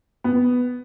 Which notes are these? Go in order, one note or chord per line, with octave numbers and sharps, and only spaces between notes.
B3